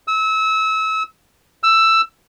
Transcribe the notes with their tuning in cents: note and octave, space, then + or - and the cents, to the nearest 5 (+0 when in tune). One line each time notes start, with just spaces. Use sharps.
E6 -30
E6 +10